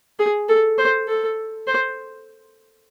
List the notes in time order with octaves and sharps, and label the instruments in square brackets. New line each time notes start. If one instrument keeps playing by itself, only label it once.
[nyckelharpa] G#4
A4
C5
A4
C5